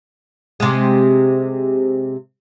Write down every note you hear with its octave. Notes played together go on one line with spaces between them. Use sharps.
C3 G#3